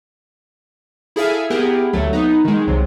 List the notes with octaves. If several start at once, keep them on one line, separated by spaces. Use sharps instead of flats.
E4 G#4 A4 E5 F5 G#5
B3 E4 G4 G#4 A#4
D2 F#3 A3
B3 D#4
D#3 G#3
C2 C3 F#3